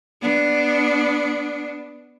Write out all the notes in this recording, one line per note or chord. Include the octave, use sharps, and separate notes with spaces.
B3 D4